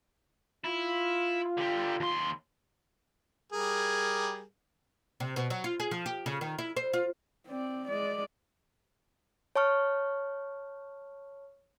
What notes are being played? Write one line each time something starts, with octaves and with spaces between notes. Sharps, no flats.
E4 F4
D3 G4
D#2 C6
G3 G#4 A#4
C3
B2
F#3
F4
G#4
F3
G4
C#3
D#3
E4
C5
F4
C4 D5
G#3 D5
C#5 A5 C#6 F6